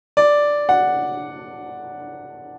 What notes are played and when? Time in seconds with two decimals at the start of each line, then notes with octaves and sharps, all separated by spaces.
0.17 D5
0.69 F#5